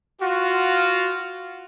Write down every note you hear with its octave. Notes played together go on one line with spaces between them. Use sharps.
F4 F#4